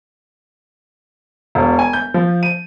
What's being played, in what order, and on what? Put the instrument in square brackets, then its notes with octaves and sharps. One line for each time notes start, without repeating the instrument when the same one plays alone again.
[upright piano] E1
G#5
G6
F3
D#7